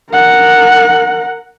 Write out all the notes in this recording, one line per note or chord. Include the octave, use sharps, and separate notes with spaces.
A#4 F#5